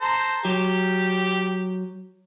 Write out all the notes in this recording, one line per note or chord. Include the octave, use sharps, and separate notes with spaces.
A4 C5 A#5
F#3 G4